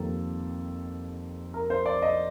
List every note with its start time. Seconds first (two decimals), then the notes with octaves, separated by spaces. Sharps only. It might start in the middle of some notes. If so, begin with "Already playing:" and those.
Already playing: F2 D#3 G3 A#3 A4
1.54 A#4
1.70 C5
1.86 D5
2.02 D#5